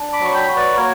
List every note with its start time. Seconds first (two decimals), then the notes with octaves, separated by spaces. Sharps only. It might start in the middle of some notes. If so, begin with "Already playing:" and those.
Already playing: D4
0.13 B5 D6
0.20 F#3 C#6
0.34 G5 B5
0.49 F#4
0.56 B4 D5
0.77 A#3 A#4 C#5